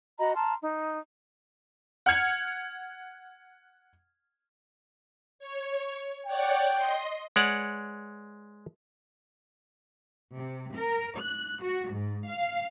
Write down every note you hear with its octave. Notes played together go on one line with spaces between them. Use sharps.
F#4 D#5 A#5 B5
A5 A#5 C6 F6
D#4
F#5 F6 G#6 C#7
C#5
C#5 D5 F#5 G5
D#5 C6
G#3 B4 C#5 D5 F#5
C3
A#4
F#6
F#4
G#2
F5